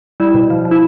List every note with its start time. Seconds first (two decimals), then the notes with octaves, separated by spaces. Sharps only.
0.20 G3 E4
0.35 B2
0.50 F3
0.65 F3
0.71 E4